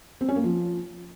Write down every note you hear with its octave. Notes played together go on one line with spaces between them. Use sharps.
C4
C#4
A#3
F3